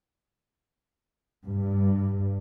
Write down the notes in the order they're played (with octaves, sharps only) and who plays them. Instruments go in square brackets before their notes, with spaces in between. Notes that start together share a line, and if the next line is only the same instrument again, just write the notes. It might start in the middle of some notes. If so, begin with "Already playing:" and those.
[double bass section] G2